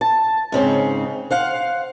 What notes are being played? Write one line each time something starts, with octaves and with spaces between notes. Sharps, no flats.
A5
G#2 C#3 C4 C#4
C5 F5 F#5